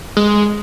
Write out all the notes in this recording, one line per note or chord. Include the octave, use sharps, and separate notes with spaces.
G#3